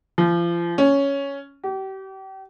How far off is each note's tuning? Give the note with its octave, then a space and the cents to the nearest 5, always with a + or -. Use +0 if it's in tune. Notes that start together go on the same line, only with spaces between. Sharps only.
F3 -35
C#4 +5
G4 -35